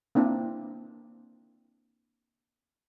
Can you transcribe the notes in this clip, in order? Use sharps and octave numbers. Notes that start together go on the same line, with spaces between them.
A#3 C4 D4 E4